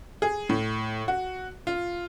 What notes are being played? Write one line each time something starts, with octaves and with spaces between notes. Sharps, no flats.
G#4
A2
F#4
F4